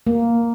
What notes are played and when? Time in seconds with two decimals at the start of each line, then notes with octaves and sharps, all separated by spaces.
0.07 A#3